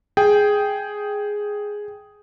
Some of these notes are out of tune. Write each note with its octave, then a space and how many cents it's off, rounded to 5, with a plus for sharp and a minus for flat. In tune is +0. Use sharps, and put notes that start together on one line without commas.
G#4 +0 G5 +0